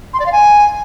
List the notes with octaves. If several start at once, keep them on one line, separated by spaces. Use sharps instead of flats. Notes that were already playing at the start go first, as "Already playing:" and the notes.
C6
D5
F5
G#5